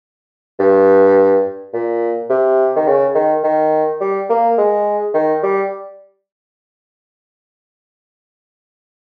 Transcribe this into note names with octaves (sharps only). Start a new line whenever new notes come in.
G2
A#2
C3
D#3
C#3
D#3
D#3
G3
A#3
G#3
D#3
G3